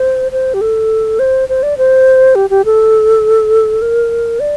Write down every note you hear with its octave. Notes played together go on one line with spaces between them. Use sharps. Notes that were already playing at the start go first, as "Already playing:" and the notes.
Already playing: C5
C5
G4
A4
C5
C5
D5
C5
G4
G4
A4
A#4
D5